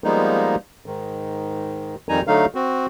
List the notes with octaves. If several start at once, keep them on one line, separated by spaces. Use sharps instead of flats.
F3 G3 G#3 A#3 B3 D#4
G#2 D#3
F2 D#3 G3 D#4 G#5 A#5
D3 F#3 A3 D#4 F5
C4 F#4